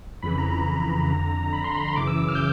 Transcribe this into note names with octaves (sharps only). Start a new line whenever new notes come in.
F2 C#3 E3 B5
A#5
A#5
A#5
F2 D3
B5
C6
B5
C6
F#2 C#3 E3 D6
E6
E6
F6
G6